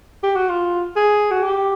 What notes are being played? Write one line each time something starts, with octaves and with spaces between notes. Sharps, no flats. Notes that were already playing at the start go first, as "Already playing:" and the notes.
G4
F#4
F4
G#4
F#4
G4